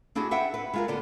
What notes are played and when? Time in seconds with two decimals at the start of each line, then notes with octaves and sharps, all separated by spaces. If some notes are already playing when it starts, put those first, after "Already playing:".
0.15 C4 D4 E4 F#4 G#4
0.31 B4 E5 F#5 G5
0.54 B4
0.73 G#3 F4 A#4
0.88 D3 B3 D4